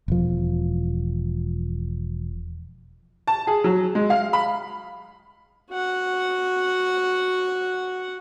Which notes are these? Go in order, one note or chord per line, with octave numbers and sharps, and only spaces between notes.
E1 F3
A5
G#4
F#3
G#3
F5
B5
F#4 F#5